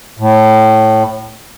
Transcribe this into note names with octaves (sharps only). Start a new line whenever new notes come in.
A2